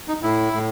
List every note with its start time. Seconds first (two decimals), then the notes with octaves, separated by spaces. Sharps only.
0.08 D#4
0.22 A2 E4
0.53 A2